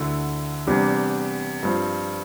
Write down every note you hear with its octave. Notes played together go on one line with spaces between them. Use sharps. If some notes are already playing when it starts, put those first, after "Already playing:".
Already playing: D2 D3 A3 E4
E2 C3 G3 D4
G2 F3 C4